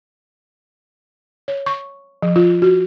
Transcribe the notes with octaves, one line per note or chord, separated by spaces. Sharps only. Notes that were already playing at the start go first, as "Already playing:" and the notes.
C#5
C#6
F3
F4
F#4